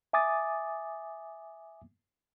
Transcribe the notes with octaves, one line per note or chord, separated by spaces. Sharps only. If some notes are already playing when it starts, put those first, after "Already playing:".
E5 G#5 D6 D#6 A6